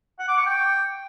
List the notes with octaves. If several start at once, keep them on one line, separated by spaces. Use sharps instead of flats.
F#5
D6
C#6
G5